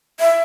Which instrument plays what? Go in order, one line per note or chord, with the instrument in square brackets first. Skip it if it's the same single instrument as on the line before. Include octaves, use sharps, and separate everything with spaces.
[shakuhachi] E5